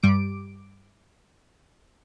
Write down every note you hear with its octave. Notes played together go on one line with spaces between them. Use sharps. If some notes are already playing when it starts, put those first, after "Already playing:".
G2 G3 D6 D7